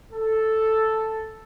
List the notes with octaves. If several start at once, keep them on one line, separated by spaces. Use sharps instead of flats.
A4